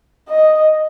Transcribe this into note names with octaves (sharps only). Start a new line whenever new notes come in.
D#5